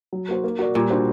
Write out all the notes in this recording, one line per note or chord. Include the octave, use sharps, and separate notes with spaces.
F#3
A#3 F#4 C5
A#3
F#4 A#4 D5
A#2 G3
D4 F#4 C5